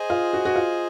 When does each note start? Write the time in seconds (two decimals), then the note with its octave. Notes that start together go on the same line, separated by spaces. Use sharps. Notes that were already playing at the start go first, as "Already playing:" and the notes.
Already playing: G#4 C5 D#5 G#5
0.10 F4
0.33 F#4
0.45 F#4
0.56 F4